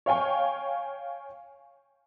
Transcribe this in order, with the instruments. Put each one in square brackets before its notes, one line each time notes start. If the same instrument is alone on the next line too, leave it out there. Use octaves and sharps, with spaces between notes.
[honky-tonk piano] C#5 F5 G5 G#5 C#6